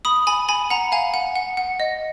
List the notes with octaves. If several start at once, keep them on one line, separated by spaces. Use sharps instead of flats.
B5 D#6
G#5 B5
G#5 B5
F#5 A#5
F5 G#5
F#5
F#5
F#5
D#5